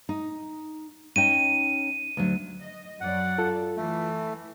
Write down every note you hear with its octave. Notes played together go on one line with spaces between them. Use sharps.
D#4
C#4 D#4 G5 D#7
D2 F#3
D#5
F#2 F#3 D5 F#5
F4 A4
E3 A3